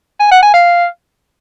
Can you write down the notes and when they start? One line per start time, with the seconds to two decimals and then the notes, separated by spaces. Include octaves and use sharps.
0.20 G#5
0.31 F#5
0.42 G#5
0.54 F5